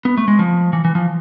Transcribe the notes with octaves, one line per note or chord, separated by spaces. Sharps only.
B3
A3
G#3
F3
E3
E3
F3